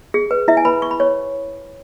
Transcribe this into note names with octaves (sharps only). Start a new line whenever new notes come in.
G#4
B4
E4 E5
G#5
B4 B5
C#6
B5
C#5 C#6